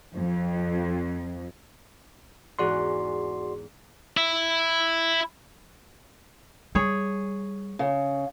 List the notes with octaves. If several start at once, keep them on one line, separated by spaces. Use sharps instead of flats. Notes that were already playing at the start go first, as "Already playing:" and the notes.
F2
E2 G#2 F#4 D5 F#5 C6
E4
G3 G#4 C#5
C#3